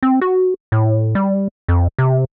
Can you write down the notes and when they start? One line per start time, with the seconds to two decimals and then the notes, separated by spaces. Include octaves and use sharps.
0.03 C4
0.21 F#4
0.72 A2
1.15 G3
1.68 F2
1.98 C3